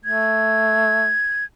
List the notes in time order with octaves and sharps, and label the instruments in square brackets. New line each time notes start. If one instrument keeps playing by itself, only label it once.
[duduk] A3 [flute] G#6